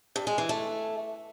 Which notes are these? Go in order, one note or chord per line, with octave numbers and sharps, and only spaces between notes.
G2
G#3
E3
A3